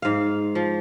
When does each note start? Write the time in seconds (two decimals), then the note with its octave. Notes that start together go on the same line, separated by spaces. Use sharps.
0.02 G#2 F5
0.55 F3